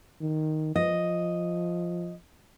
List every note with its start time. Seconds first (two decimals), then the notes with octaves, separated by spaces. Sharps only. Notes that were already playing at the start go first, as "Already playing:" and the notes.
0.21 D#3
0.76 F3 D#5